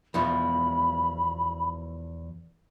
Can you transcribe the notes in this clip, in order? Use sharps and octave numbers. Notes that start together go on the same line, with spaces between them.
E2 B2 F3 B5